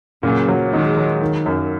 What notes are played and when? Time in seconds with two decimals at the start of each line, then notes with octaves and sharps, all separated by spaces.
0.23 A#2 C#3 F#3
0.48 F#3
0.72 D#3 G#3 D#4
0.97 F#3
1.21 D#3
1.46 F#2